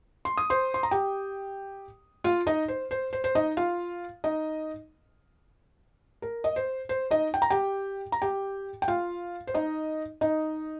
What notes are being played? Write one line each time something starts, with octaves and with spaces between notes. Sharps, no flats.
C6
D#6
C5 C6
C6
A#5
G4 G5
F4 F5
D#4 D#5
C5
C5
C5
C5
D#4 D#5
F4 F5
D#4 D#5
A#4
D#5
C5
C5
D#4 D#5
G5
A#5
G4 G5
A#5
G4 G5
G5
F4 F5
C5
D#4 D#5
D#4 D#5